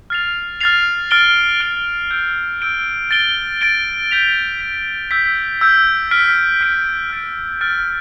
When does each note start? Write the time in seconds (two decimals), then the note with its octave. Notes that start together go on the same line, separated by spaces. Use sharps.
0.10 F6 A6 C7 F7
0.61 F6 A6 C7 F7
1.11 F6 A6 D7 G7
1.60 F6 A6 D7 G7
2.11 E6 G6 D7 G7
2.61 E6 G6 D7 G7
3.11 A6 D7 G7
3.61 A6 D7 G7
4.11 G6 B6 F7
4.61 G6 B6 F7
5.11 E6 G6 B6
5.61 E6 G6 B6
6.11 F6 B6 D7
6.61 F6 B6 D7
7.11 F6 A6 D7
7.61 F6 A6 D7